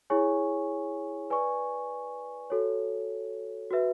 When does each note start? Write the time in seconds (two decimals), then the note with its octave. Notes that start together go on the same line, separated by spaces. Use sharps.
0.10 E4 G#4 C#5 G#5 C#6
1.30 B4 D5 G#5 C#6
2.50 F#4 A4 C#5
3.71 F#4 B4 E5